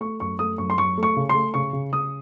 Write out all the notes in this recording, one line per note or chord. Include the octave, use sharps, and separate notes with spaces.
A3 C#6
F#2 C#6
A3 D#6
F#2 C#6
C6
F#2 C#6
A3
C#6
C#3
C6
A3
C#3 C#6
C#3
C#3 D#6